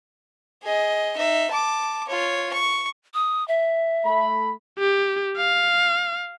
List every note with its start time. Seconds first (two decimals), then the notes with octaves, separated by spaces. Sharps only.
0.63 G#4 D#5
1.17 D#4 E5
1.51 A5 D6
2.08 F4 C#5
2.53 C#6
3.14 D#6
3.48 E5
4.05 A3 B5
4.79 G4
5.37 F5